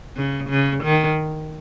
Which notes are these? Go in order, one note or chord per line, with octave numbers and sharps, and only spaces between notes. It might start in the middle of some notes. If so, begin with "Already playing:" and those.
C#3
C#3
D#3